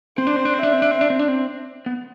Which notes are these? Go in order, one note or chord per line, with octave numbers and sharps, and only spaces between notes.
C4 C5
D4
C4
D4
C4
D4 E5
C4
D4
C4
D4
C4
D4
C4
B3